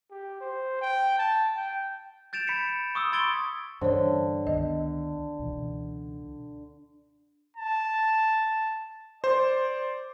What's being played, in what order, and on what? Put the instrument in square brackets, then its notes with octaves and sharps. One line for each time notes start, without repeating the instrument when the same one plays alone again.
[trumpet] G4
C5
G5
A5
G5
[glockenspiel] G6 A6 D7 E7 F7
B5 B6 C#7 E7
C#6 D#6 E6
B5 C6 G#6 A6 D7 G7
[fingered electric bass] G2 E3 [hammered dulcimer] D3 [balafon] C5 C#5
[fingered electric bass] C#2 D#3 B3 [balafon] D#5
[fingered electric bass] C#2 B2 E3
[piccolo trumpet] A5
[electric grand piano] C5 [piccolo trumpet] D5